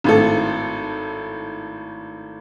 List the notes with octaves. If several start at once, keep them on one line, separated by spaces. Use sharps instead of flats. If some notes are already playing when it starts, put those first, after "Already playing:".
G#1 A2 A4